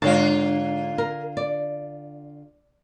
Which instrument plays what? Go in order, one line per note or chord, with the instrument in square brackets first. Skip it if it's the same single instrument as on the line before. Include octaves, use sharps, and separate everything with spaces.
[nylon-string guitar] G#2 C#5 A5 [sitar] D3 F4
[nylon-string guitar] A#4
D5